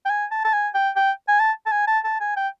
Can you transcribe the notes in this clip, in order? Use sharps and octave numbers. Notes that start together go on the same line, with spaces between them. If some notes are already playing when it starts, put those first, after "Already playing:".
G5
G#5
A5
A5
G#5
G5
G5
G#5
A5
A5
G#5
A5
A5
G#5
G5